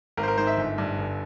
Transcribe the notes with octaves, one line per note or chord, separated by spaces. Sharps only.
G#1 A#4
C5
A#4
G#2 C5
E5
G1
G2
G1